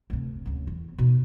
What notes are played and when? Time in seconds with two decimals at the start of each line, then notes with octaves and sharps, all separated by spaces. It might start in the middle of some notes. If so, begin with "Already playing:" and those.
0.10 D2 C3
0.46 D2 C#3
0.67 E2
0.98 B2 D#4